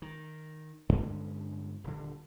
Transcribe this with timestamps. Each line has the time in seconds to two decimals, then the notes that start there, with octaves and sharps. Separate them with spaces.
0.02 D#3
0.89 G2 D3 G#3 C#4
1.84 D#1 D3